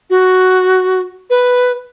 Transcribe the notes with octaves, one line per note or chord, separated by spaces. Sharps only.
F#4
B4